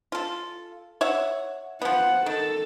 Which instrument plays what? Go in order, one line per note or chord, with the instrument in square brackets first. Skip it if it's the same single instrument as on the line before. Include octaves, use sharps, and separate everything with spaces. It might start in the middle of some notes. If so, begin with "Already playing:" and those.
[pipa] F4 A4
C#5 E5 F#5
[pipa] F3 B3 [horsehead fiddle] F#5
[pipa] D#3 [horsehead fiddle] A4